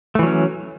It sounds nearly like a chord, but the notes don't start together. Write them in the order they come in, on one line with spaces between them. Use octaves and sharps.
A3 E3 F#3 C#4